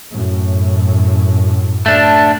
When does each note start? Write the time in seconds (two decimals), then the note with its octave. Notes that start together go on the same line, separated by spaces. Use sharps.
0.11 F#2 A2
1.86 A3 D4